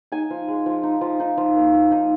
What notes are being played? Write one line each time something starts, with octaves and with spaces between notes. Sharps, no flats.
D#4 G#5
F3
G#3
F3
D#4
F3
D#4
F3
A#3
F3
D#4